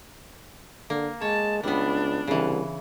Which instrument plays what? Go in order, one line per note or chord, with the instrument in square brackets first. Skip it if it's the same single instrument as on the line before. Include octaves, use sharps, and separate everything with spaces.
[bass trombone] D3 [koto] A#3
[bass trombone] G#3 [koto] C#5 [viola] A5
[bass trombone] C#2 [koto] G3 B3 [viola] D4
[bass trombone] C2 [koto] C#3 E3